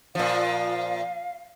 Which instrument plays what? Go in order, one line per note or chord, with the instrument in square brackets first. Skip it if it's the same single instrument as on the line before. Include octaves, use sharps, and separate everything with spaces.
[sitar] A#2 F3 [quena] F5